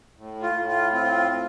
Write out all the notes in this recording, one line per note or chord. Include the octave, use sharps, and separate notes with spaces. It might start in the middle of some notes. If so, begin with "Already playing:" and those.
A2
F4
A2
F4
C4 F4
C4